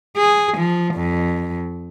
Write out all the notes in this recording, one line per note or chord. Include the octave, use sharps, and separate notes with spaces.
G#4
F3
F2